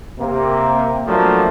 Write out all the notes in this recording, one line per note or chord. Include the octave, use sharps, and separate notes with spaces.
C3 A#3
F3 F#3 A3 A#3 D4